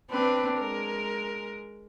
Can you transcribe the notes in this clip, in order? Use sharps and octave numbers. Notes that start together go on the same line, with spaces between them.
C4 D4 B4
G#3 A#4